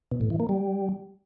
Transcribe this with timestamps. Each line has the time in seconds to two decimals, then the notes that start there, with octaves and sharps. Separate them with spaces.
0.12 B2
0.21 A2
0.30 E3
0.40 A#3
0.49 G3